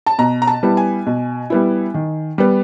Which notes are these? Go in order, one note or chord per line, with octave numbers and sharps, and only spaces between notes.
A5
B2 A#5
A#5
A5
G3 B3 E4
G#5
B2
G3 B3 E4
D#3
G3 B3